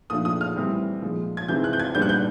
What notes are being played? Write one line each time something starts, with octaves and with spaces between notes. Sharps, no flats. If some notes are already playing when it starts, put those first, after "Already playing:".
A#2 F3 A3 D4 D#6
D#6
F6
A2 E3 G3 C4
A#2 F3 G#3
G#6
C3 E3 G#3 C4 G6
F#6
G6
G#6
A#2 G3 B3 D4 G6
F#6
G6